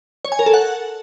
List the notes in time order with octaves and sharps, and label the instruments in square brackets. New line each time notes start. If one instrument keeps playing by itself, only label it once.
[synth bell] C#5
G#5
A#4
A4
F#5